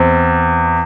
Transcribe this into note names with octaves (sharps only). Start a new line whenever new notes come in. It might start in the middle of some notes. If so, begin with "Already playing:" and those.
Already playing: E2 C4